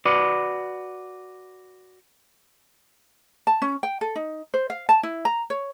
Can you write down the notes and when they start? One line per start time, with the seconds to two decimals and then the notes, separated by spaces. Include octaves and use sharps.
0.06 F#4 B4 D5
3.47 A5
3.62 C#4
3.83 G5
4.01 A4
4.16 D#4
4.54 C5
4.70 F5
4.89 A5
5.03 E4
5.25 A#5
5.50 C#5